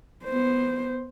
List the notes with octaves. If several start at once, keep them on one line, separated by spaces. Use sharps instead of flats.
B3 C5